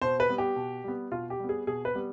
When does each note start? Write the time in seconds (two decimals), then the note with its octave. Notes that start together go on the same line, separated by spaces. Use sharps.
0.01 B2 C5
0.20 B4
0.29 G3 B3
0.38 G4
0.56 B2
0.84 G3 B3
1.11 B2 F4
1.30 G4
1.39 G3 B3
1.49 G#4
1.67 B2 G#4
1.85 B4
1.95 G3 B3